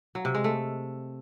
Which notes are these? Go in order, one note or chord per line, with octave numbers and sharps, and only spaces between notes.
F#3
C3
G#3
A3